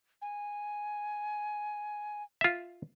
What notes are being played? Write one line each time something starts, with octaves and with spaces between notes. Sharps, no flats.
G#5
F4 E5